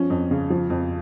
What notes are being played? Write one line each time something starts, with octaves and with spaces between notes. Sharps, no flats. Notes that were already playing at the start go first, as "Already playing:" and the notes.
Already playing: F3 C#4
F2
C#3
F3
F2